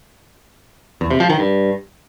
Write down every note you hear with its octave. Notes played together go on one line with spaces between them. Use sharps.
E2
C3
F3
D#3
G2